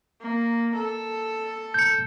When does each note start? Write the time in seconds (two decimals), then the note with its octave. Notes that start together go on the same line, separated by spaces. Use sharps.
0.21 A#3
0.75 A4
1.74 G6 C#7